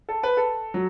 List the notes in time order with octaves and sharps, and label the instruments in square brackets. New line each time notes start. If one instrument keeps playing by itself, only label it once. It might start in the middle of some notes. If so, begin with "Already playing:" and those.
[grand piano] A4
B4
A4
F#3